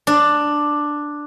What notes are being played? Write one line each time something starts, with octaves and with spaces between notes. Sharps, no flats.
D4